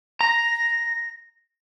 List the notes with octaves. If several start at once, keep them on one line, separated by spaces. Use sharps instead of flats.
A#5 A#6